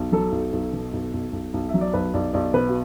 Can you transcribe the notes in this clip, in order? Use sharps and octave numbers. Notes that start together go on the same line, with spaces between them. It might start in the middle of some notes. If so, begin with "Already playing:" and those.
Already playing: B1
F#3 A4
B1
B1
B2
B1
B1
B1
B1
F#3 E5
D5
B1 B4
B1 D5
B1 D5
B2 B4
F#4